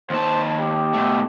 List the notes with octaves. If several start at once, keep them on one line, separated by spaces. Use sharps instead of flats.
D#2 C5 A5
G4
B2 A3